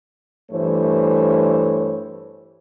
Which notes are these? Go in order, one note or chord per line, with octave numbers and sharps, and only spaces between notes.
G2 E3 A3 C5 C#5